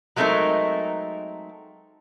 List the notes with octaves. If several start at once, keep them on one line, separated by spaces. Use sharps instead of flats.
F#3 G#3 A3 C4 D#4 A#4